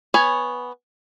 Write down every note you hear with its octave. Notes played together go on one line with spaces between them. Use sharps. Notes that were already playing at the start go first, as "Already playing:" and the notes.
B3 B4 C#5 G#5